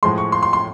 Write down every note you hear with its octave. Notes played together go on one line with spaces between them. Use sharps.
A2 F3 G#3 C6
C#6
C6
C6
C6